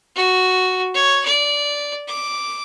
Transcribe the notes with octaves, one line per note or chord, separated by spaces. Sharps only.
F#4
C#5
D5
D6